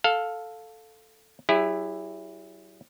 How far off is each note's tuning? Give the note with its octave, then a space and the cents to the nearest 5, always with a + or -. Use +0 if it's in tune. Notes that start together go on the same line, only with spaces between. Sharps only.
A4 +0 F5 +15
F#3 +35 E4 +0 G#4 -45